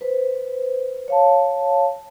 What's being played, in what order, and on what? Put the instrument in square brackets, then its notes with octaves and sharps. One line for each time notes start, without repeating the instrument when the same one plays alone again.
[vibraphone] B4 C5
C#5 F5 A5